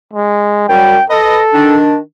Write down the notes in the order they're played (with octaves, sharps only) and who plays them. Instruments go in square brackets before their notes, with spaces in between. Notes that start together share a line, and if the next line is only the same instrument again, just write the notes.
[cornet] G#3
[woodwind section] F#2 G3 [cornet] G5
[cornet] A4 [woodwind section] B4 D#5
[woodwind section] D#3 D4